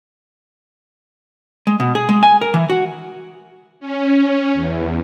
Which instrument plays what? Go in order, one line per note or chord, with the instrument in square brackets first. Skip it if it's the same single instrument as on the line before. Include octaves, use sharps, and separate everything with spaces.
[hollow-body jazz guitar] G#3
B2
G#4
G#3
G#5
A#4
E3
F#4
[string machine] C#4
E2